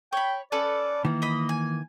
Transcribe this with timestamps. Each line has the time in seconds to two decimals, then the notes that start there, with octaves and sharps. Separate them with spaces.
0.13 C#5 G5 B5
0.52 C#4 A4 B4 D5
1.05 D#3 E3 A#3
1.22 D#5 B5
1.49 G#5